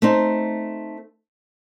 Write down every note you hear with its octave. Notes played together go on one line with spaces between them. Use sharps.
A3 C4 D#4